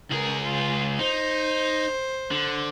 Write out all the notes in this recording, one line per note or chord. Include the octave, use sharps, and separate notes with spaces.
C#2 G#4 A#4
F4
D#4 C5
D3